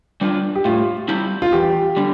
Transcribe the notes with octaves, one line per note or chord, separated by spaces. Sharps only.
G3 D4 F4
G4
A2 F4
G3 C4 E4 G4
F4
E2 G4
D3 G3